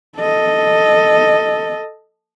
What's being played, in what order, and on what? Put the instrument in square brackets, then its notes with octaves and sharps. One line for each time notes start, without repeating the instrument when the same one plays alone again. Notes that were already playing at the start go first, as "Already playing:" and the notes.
[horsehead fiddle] A4 D#5